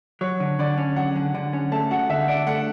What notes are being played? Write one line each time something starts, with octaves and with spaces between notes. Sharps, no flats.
F#3 C#5
D3
D3 D5
C#4
F#3 F#5
D3
D3 F#5
C#4
A3 A5
F#4 F#5
D3 E5
D4 F#5
A3 F#5